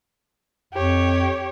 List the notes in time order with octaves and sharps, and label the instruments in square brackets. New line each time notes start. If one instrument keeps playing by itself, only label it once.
[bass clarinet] F2 [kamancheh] G4 C#5